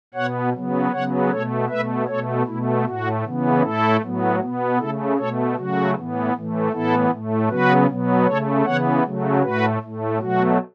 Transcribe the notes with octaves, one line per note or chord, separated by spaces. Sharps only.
B2 B3 C#5 F#5
C#3 F#3 B3
C#3 F#3 B3 C#5 F#5
B2 A3 A4 C#5
B2 A3 B4 E5
B2 A3 A4 C#5
B2 A3 E4
A2 A3 F#4
C#3 E3 B3
A2 A3 E4 A4
A2 F#3 B3
B2 B3
C#3 A3 E4 A4
B2 A3 A4 C#5
C#3 F#3 A3 F#4
A2 E3 B3
A2 E3 A3
A2 E3 B3 E4 A4
A2 A3
C#3 F#3 B3 F#4 B4
B2 F#3 B3
C#3 A3 A4 C#5
C#3 E3 B3 C#5 F#5
C#3 F#3 A3
A2 A3 F#4 B4
A2 A3
B2 F#3 A3 F#4